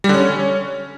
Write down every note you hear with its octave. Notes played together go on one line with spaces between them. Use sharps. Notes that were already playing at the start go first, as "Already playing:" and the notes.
G3
D3
C#4